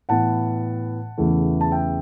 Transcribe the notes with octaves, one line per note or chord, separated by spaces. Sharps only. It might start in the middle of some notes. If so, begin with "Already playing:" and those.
A2 E3 B3 F#5 A5
E2 C#3 E3 A3
A5
E5 G5